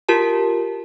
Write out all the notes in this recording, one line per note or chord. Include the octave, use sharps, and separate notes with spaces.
F4 G4 A#4 A5